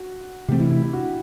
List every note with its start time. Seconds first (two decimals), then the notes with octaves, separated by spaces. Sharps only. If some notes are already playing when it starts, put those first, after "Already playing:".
Already playing: F#4
0.48 C3 E3 A3 C4 G4
0.59 E4
0.70 E4
0.82 E4
0.93 F#4